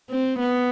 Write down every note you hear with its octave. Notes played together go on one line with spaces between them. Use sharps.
C4
B3